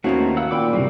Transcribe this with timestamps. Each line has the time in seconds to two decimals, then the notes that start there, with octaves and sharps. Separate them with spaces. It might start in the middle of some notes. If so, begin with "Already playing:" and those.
0.04 D#2 D#3 A3 C4 C#4 D#4 E4 F#4
0.37 B4 F5 F#5 E6
0.51 A#2 G5 B5 D6
0.73 C3 D#3 E3 G3 A#3 C4 F#4